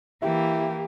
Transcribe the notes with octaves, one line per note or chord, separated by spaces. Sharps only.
E3 A#3 E4 G4